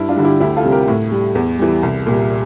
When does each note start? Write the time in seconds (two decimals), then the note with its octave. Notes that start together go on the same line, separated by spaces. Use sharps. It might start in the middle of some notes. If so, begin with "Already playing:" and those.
Already playing: G2 E4
0.09 D4 F4
0.17 D3 G3
0.25 E4 G4
0.40 D2 E4 G4
0.56 F4 A4
0.64 C3 G3
0.72 G4 A#4
0.88 A2
1.12 G3
1.35 E2
1.59 E3 G3
1.83 C2
2.07 A#2 G3